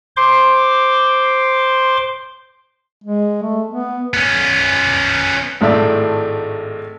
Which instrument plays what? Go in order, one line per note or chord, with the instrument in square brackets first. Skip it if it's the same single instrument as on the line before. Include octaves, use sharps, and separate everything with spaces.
[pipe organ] C5 C6 D6
[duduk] G#3
A3
B3
[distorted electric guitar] B3 C#4
[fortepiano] G#1 A2 A3 D5